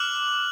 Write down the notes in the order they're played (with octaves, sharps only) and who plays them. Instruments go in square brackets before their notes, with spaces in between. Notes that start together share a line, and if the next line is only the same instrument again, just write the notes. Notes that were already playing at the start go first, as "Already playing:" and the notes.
Already playing: [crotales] D6 F6 F#6 F#7